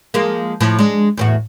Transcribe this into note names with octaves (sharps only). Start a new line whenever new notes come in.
F3 G#3 A#3
A2 F3
G#3 D4
E2 A2 F#4